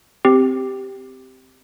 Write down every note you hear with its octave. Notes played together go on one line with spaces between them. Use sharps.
C4 G4